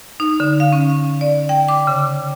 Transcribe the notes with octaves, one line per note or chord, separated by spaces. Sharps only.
D#4
D3
F5
C#4
D5
G5
D6
C#3